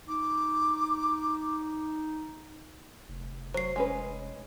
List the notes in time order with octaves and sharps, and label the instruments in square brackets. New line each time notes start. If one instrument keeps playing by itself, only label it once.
[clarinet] D#4 [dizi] D6
[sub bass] F1
[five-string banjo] F#3 [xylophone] C5 C7
[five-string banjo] G#3 C#4 B4